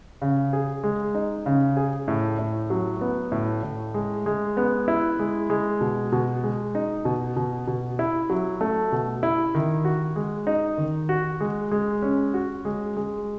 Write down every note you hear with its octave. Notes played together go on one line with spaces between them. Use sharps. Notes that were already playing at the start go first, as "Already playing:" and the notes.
C#3
G#4
G#3
D#4
C#3
G#4
A2
A2
F#3
B3
A2
A2
G#3
G#3
B3
E4
G#3
G#3
B2
B2
G#3
D#4
B2
B2
B2
E4
F#3
A3
B2
E4
D#3
F#4
G#3
D#4
D#3
F#4
G#3
G#3
C#4
F#4
G#3
G#3